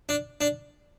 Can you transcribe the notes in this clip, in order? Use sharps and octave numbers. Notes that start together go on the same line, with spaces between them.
D4
D4